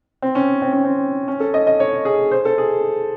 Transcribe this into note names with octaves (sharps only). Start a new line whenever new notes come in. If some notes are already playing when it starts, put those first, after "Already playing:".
C4
C#4
C4
C#4
C4
C#4
A4
D#5
D#5
C#5
G#4
C5
A4
G#4